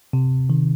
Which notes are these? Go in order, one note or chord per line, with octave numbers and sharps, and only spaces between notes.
C3
D#3